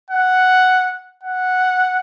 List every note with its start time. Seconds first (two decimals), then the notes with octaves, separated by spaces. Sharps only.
0.10 F#5
1.23 F#5